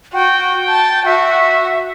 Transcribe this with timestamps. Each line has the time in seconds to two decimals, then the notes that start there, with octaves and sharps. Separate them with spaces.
0.13 F#4 G5
0.68 A5
1.05 F#4 E5